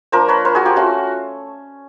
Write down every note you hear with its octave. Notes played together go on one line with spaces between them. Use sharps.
F3 A#3 D4 A#4 C5
B4 C#5
A#4 C5
F#4 G#4
F4 G4
A3 C#4 F4 F#4